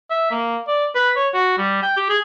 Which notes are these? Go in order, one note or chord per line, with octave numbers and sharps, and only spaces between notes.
E5
A#3
D5
B4
C#5
F#4
G3
G5
G4
G#4